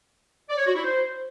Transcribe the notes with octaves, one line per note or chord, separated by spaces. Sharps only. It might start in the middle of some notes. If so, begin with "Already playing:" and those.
D5
C#5
F#4
E4
C5